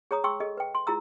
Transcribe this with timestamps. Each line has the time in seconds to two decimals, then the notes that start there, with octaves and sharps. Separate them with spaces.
0.11 G#4 C#5 A#5 D#6
0.24 G#4 G5 C6 C#6 E6
0.40 G#4 A4 D#5
0.57 B4 G5
0.75 C6
0.87 E4 F4 G#4 A#5 E6